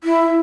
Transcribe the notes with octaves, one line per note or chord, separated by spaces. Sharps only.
E4